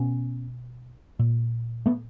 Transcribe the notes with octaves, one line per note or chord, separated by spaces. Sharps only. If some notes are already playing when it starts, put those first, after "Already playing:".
Already playing: B2 B3 C#4
A#2
A3 B3